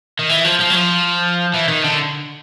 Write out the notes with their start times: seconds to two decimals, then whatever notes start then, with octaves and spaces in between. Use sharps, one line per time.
0.19 D#3
0.29 E3
0.45 F3
0.60 F3
0.70 F#3
0.75 F3
1.54 E3
1.68 D#3
1.84 D3